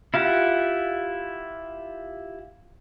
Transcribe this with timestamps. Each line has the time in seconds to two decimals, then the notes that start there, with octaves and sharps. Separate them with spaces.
0.14 E4 F4 G4 F#5